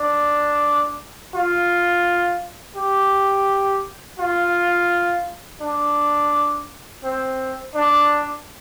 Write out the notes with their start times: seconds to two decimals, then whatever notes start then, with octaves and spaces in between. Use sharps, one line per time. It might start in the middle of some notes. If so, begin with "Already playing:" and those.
Already playing: D4
1.34 F4
2.76 G4
4.19 F4
5.61 D4
7.04 C4
7.75 D4